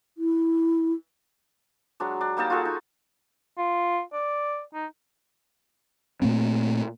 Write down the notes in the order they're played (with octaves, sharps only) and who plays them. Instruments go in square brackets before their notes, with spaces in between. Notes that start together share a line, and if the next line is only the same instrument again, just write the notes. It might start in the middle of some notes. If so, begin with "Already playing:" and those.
[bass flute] E4
[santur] F#3 G#3 D4
D4
G3 A#3 D#4 A5
F4 F#4 G#4 A4
D#4
[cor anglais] F4
D5
D#4
[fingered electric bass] A#2 A3 A#3 C4